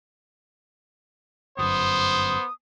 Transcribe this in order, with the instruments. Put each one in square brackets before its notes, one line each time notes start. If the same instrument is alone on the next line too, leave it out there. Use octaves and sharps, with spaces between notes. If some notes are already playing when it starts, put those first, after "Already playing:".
[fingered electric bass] G1 F#2 [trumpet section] B3 C5 [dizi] D#6